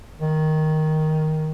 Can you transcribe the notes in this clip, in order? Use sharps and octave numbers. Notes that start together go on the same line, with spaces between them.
D#3